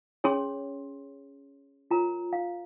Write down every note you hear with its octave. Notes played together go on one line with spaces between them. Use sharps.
C#4 G#4 C#5 C6
F4 A#4 C#5 A#5
F5